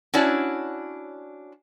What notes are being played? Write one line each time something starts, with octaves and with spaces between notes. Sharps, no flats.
C#4 D4 E4 F#4 C#5 D5